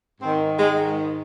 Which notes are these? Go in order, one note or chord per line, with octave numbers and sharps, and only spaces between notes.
G#2 D#3 C4
G#3